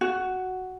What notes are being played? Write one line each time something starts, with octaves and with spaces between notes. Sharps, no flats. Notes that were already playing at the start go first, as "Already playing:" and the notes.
F#4